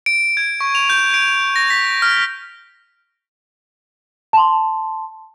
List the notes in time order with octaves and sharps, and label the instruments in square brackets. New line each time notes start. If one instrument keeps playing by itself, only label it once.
[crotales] D7
G#6
C#6
F7
G6
D7
A#6
B6
F6
[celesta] A5 C6